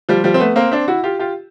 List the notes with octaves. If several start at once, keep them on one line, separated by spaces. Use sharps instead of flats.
F3 G3
F3 G3
C4
A3 B3
A#3 C4
C4 D4
E4 F#4
F4 G4
F4 G4